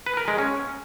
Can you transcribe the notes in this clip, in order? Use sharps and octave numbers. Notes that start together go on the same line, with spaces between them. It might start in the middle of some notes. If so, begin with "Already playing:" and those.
B4
A#4
G#3
C#4